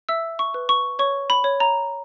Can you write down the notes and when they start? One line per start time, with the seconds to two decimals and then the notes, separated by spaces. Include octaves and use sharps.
0.09 E5 E6
0.39 C#6
0.54 B4
0.69 C#6
0.99 C#5 C#6
1.30 B5
1.44 C#5
1.60 A#5